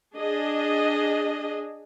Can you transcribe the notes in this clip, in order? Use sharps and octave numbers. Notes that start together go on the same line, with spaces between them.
D4 G#4 D#5